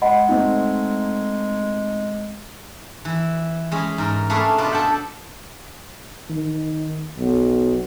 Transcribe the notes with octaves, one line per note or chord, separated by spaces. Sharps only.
G#3 D#5 F#5 B5
A3 C4 D#4
E3
G#3 C#4 G#4 B5
G#2 A#4
A3 A#3 C#4 D4 G#4 B4
B2 D4 F4 B4
G#4 A4 E5 F#5 G5
D#3
B1